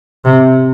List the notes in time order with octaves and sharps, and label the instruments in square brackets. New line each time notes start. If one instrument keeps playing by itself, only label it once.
[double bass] C3